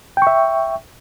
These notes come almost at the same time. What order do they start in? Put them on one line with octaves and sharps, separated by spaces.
G5 C#6 E5